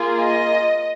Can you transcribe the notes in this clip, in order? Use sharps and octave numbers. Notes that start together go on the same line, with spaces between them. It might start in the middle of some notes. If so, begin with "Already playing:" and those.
Already playing: A#3 F4 G#4
D#5